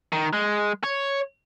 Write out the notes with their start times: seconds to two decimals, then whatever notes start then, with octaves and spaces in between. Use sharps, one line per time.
0.13 D#3
0.33 G#3
0.84 C#5